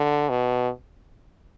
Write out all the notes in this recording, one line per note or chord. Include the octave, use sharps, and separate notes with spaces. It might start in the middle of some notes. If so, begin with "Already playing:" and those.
Already playing: D3
B2